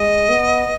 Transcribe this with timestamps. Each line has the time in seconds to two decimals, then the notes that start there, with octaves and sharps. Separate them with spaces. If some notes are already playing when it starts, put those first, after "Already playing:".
Already playing: G#3 D#5
0.29 B3